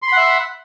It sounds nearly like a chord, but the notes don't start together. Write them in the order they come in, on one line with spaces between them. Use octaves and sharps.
C6 B5 F#5 E5